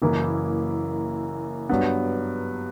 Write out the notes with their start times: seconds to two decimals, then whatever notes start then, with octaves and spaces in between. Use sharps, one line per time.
0.02 F#1 F#2 E3 A#3 E4
1.69 G2 F#3 B3